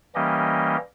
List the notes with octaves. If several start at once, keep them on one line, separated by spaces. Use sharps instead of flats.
E3 G3 A#3 C#4 G4 D#5